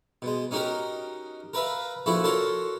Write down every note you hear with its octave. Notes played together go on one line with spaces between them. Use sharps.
B2 G#3
C#4 D#4 F#4 G4 A#4
A#4 B4 E5 F5
A#1 F3 E4 F#4 A4 C#6
F#4 A4 A#4 C#5 A5 C6